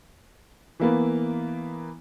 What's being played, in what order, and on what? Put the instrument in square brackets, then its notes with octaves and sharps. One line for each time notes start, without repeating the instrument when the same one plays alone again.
[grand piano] E3 A#3 B3